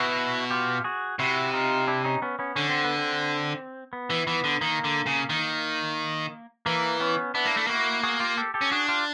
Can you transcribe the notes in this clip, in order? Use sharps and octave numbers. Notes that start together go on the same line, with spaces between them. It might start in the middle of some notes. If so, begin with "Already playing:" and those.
Already playing: B2 E4 F#4
F4 G4
F#4 G#4
C3 E4 F#4
D#4 F4
D4 E4
C#4 D#4
B3 C#4
B3 C#4
D3 C#4
C4
B3
C4
B3
E3
E3 B3
D3
D#3 A#3
D3
C#3
D#3
E3 A#3
B3 C#4
B3 D4 E4
A#3
A3
A#3 E4 F#4
F#4 G#4
F4 G4
G4 A4
G4 A4
C#4
D4 F#4 G#4
F4 G4